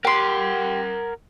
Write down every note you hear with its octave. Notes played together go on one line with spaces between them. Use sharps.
G4 A#4 F#5 C6